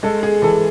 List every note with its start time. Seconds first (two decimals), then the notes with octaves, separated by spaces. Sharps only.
0.03 G#3 A4
0.23 G#4
0.42 E3 A4